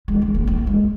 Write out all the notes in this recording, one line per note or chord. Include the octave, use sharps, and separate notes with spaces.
G#3
G#3
A#3
A#3
G#3